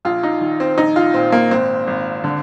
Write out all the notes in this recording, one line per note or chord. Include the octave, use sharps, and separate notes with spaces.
A#1 F4
D#4
D#3
C4
A#1 D#4
F4
A#2 C4
A#3
G#1 C4
G#1
D3